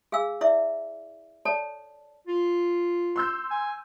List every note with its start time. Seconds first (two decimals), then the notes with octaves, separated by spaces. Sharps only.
0.12 G#4 F5 G#5 E6
0.41 E4 D5 E5 D6
1.45 A4 C#5 D5 A5
2.27 F4
3.16 C6 E6 G6
3.51 G#5